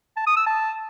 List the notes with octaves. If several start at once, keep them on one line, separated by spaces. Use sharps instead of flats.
A5
D#6
E6
A5